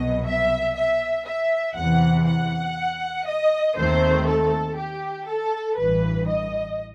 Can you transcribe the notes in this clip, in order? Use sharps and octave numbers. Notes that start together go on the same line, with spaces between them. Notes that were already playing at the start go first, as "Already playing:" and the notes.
Already playing: C2 B2 F#3 D#5
E5
E5
E5
E2 C3 E3 F#5
F#5
D#5
D#2 D#3 A3 C4 C5
A4
G4
A4
A1 G2 E3 B4
D#5